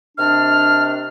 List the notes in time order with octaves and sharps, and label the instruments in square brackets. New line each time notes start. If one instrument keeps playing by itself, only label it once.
[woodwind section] C3 D#3 D4 [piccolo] F6